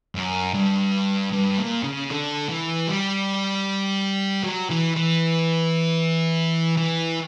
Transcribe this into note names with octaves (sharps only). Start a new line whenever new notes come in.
F#2
G2
G2
A#2
C#3
D3
E3
G3
F#3
E3
E3
E3